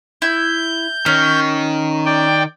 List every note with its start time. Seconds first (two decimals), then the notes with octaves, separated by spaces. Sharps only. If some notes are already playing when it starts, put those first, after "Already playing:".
0.22 E4 G6
1.06 D#3 C#4
2.06 D5 G5